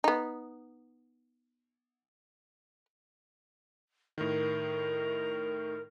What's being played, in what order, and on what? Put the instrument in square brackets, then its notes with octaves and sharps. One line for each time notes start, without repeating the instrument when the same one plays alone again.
[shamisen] B3 D#4
[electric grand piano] A2 D#3 [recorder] A#4